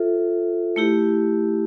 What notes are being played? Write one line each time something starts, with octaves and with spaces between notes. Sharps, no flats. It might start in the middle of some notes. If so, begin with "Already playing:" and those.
Already playing: F4 A4 C5 E5
A3 E4 G4